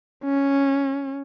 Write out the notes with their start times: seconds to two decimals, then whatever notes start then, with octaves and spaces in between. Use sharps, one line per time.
0.25 C#4